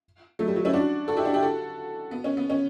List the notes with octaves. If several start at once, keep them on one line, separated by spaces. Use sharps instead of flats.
F#3 A3
G3
F#3
C#4 E4
D4 F#4
F#4 A4
E4 G4
D4 F#4
E4 G4
F#4 A4
B3
C#4
B3
C#4